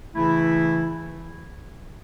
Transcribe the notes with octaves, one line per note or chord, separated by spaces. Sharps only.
C#3 E3 A3 E4